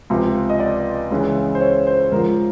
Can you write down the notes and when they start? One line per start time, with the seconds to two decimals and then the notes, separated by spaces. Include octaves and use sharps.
0.10 C#2 C3 F3
0.50 D#5
0.60 D5
1.11 C#2 C#3 E3
1.55 C5
1.61 C#5
1.87 C5
2.12 G#2 A#4
2.15 F3